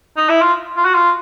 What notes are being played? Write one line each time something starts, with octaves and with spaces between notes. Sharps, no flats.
D#4
E4
F4
F4
F#4
F4